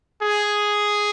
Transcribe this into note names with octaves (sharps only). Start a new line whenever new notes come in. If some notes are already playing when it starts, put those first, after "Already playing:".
G#4